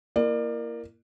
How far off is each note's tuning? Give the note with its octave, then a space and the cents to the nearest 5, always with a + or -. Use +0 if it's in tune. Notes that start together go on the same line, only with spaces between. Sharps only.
A#3 +0 E4 +30 D5 +30